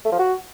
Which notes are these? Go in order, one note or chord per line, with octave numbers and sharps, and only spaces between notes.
A3
F3
F#4